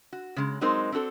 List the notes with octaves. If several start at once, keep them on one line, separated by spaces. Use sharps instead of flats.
F#4
C#3 G#3
F#3 G#3 C4 D#4 A#4 C5
C4 D4 F#4 A4